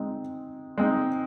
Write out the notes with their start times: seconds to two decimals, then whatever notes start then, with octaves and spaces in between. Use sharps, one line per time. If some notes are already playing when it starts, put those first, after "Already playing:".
Already playing: G#3 C4 D#4
0.78 G#3 C4 D#4